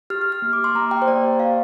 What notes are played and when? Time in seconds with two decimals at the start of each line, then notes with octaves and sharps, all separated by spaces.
0.10 G4 F6
0.21 F6
0.26 G4
0.32 F6
0.42 A#3
0.53 D6
0.58 G4
0.64 C6
0.75 A#3 A#5
0.91 G4 G5
1.02 C5
1.08 A#3 D5
1.24 G4
1.39 G4 F5